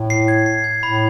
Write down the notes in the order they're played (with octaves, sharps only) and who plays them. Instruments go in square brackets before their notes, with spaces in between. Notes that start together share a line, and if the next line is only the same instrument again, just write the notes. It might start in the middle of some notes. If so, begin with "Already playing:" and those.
Already playing: [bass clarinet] A2
[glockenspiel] C7
G#6
C7
G#6
[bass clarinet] A2 [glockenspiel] B5